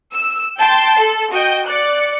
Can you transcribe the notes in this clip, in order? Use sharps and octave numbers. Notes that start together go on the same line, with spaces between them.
E6
G5 A5 C6
A4
F#4 D#5 G5
D5 F#6 C#7